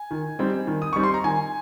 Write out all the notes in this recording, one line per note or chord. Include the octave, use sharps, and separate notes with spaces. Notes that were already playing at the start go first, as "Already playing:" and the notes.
Already playing: G#5
D#3
G3 C4 D#4
D#3
D#6
G3 C4 D#4 C#6
C6
A#5
D#3 G#5